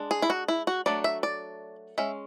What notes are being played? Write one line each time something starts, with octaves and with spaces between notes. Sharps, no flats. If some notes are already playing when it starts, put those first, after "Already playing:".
Already playing: G#3 D4
G#4
E4
F#4
E4
F#4
F#3 A3 D4 D5
E5
D5
G#3 C#4 E5